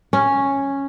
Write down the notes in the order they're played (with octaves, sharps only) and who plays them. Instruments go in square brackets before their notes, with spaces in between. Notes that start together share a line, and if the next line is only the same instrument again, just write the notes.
[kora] C#4